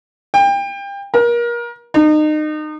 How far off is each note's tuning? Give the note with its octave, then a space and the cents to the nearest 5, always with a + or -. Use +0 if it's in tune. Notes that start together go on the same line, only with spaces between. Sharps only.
G5 +30
A#4 +30
D#4 -30